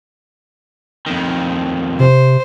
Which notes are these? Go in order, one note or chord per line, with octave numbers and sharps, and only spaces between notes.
F2 D#3
C3 C5